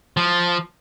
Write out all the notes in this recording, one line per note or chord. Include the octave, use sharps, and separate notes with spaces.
F3